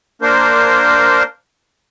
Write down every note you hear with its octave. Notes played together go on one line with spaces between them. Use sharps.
A#3 D4 A#4 C5